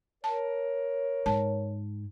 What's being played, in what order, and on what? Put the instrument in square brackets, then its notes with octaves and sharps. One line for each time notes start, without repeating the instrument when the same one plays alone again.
[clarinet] A#4 [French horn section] C#5 [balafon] A5
[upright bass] G#2 [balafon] A5